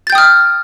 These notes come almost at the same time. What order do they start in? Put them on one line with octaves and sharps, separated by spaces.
A6 G6 G5 D#6 F6